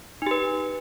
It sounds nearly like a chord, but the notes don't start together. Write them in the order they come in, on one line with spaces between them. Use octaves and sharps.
D#4 G4 B4